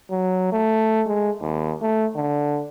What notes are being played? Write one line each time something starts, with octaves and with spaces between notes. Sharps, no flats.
F#3
A3
G#3
D#2
A3
D3